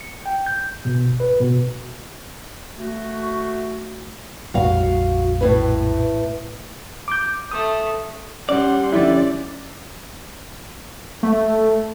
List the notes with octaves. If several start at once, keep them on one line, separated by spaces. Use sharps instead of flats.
C#7
G5
G6
B2
G1
B4
B2
A3 F#4
A#1 F2 G3 F#4 F5
A2 B4
D6 G6
A3 D#6
G3 C#4 D5 F#5 C6
D3 F3 G3 E4 D5
A3